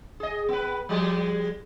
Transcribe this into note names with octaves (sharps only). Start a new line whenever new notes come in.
G#4 D#5
B3 B4
F3 G3 G#3